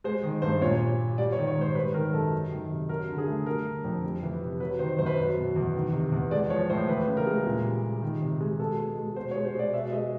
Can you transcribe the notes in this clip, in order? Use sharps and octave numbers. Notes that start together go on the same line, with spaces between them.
G#3 C5
D#3
G2 C5
A#2 C#5
G3
G3
G3 D5
C#5
D#3
C#5
G#2
C5
G3 B4
D#3 A#4
F#2 A4
F#3
D#3
C3
F#3 A#4
D3
G#4
A3
G3 A#4
D3
F2
G3
E3
C3
F#3 B4
D#3 C5
F#2 C5
B4
F#3 C5
B2
E2
D#3
C3
E2
G#3 D5
F3 C#5
A2 C5
E3 B4
C#3
A#4
G#3
A#2
G3
G3
D#3
C3
G#3
B2 A4
G#3
G#3
B2 C5
C#5
G#3
C5
G#3 D5
B2 E5
E5
G#3 D#5